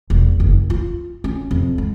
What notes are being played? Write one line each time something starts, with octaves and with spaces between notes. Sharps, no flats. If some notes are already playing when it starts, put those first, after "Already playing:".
E1
F#1
F4
C#4
F2
G#3